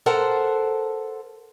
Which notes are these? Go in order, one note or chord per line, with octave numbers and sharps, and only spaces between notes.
A4 A#4 C5 F#5 A5